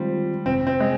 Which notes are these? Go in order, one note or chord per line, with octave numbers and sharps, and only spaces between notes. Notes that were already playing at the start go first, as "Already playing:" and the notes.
Already playing: D#3 G3 G#3 C4 F4 C5
G1 F2 C3 C4
C4
G#3